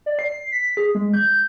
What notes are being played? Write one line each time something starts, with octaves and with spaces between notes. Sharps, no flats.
D5
C7
B6
G#4
G#3
G6